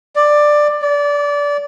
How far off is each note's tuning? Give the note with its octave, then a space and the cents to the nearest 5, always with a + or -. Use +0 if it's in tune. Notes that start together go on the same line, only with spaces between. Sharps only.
D5 +10
D5 -25